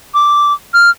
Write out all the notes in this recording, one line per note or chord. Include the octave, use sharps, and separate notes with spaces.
D6
F6